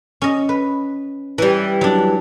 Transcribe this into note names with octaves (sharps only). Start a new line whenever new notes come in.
C#4 D#5
B4
E3 G3
F#3 D4